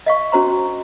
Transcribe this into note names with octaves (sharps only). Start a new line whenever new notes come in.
D#5 F5 C#6
C#4 F#4 C5 A#5 C6